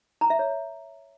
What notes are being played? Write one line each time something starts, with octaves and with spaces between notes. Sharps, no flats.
A#5
E5
C#5